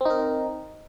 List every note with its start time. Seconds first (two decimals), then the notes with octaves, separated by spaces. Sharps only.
0.01 C4
0.05 D#4
0.10 A#4